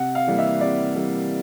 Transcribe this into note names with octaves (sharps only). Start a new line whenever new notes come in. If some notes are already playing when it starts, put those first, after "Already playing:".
Already playing: C3 F#5
F5
E3 G3 A#3
E5
C3 D5
E3 G3 A#3